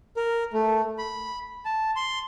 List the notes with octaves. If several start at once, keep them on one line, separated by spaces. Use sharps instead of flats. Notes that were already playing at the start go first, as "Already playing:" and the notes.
A#4
A3
B5
A5
C6